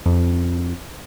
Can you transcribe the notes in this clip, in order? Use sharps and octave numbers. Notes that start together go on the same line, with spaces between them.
F2